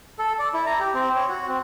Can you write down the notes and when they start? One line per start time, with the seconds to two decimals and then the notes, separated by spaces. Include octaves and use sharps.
0.19 A4
0.39 D5
0.54 E4
0.66 A#5
0.80 G4
0.94 C4
1.16 C#5
1.29 F#4
1.48 C4